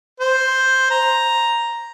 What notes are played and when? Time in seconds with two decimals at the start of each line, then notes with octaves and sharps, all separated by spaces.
0.20 C5
0.90 A#5